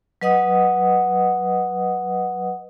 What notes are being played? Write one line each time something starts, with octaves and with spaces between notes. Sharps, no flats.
F#3 B4 D#5 F#5 D#6